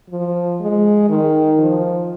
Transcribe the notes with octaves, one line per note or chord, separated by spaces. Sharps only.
F3
G#3
D#3
F3